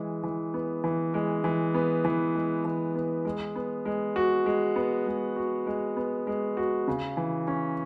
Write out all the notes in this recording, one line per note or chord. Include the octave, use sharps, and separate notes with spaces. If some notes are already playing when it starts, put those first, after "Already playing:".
Already playing: E3 G#3
E3
B3
E3
G#3
E3
B3
E3
G#3
E3
B3
G#3
B3
G#3
F#4
G#3
B3
G#3
F#4
G#3
B3
G#3
F#4
C#3
E3
C#4